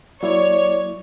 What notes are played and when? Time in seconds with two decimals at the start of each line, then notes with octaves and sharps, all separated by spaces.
0.23 F#3 A#3 E4 C#5 D5